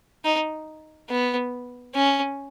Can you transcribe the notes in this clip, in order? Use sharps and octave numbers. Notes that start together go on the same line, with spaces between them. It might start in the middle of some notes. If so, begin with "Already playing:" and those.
D#4
B3
C#4